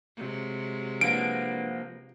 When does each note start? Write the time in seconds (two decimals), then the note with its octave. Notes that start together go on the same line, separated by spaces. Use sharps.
0.17 C3 F#3 G#3
1.01 F3 A#3 D4 B4 F#5 D7